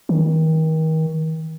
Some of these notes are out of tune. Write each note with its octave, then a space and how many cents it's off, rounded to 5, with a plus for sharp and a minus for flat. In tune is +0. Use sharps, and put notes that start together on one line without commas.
D#3 +35